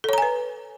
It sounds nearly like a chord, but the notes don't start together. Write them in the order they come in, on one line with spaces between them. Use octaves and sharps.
A4 C#5 A#5 G#5 B4